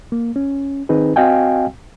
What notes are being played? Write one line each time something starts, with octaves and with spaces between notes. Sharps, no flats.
A#3
C#4
D#3 C4 D#4 G#4 B4
C4 F#4 D#5 F5 G5 G#5